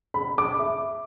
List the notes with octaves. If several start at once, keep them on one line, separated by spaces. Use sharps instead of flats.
B5
D6
E5